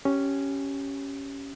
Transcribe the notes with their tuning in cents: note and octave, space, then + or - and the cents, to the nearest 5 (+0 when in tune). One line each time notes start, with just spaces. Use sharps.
C#4 +0 G4 -10